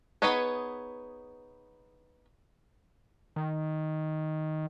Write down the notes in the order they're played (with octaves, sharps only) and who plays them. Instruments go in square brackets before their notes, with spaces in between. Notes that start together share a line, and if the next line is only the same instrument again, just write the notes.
[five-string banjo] B3 D#4 G#4 B4 C#5
[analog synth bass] D#3